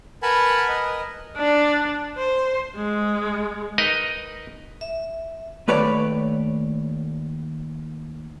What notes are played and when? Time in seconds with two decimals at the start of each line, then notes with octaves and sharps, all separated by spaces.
0.23 A#4 B4 F#5 G#5 A5 B5
0.69 A#4 B4 D#5
1.37 D4
2.18 C5
2.76 G#3
3.78 D#4 A#4 B4 D#5
4.81 E5
5.68 D#2 A3 B4 C#5 D5